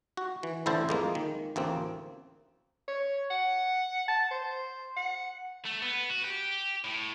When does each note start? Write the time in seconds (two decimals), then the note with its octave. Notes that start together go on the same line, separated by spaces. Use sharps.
0.17 F#4
0.43 E3
0.66 A1 D3 E4 C5 A5
0.89 F2 G#3 A#3
1.15 D#3
1.56 A1 D2 A#3 C4
2.88 C#5
3.31 F#5
4.08 A5
4.31 C5
4.97 F#5
5.66 A3
5.82 B3
6.10 F#4
6.25 G4
6.84 A2